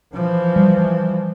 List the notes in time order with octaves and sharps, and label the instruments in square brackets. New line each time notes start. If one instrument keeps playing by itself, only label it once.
[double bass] E3 F3
[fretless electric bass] G3